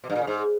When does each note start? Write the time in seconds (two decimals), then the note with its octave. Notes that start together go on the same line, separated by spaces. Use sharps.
0.04 B2
0.10 G2
0.15 A#2
0.21 C#3
0.27 G#2